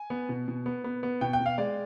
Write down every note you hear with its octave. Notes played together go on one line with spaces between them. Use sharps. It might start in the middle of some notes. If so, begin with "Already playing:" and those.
Already playing: G#5
B3
B2
B2
B3
B3
B3
B2 G5
G5
B2
F5
G#3 D5